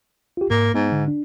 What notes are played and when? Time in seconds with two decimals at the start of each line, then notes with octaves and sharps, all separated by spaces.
0.37 F4 G4
0.51 G#2 A#3
0.74 G#2 B3
0.92 D3
1.08 D4